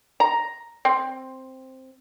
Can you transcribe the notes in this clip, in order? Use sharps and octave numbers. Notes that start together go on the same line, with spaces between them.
A#5
C4